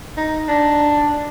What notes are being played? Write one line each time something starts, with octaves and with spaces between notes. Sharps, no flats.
D#4
D4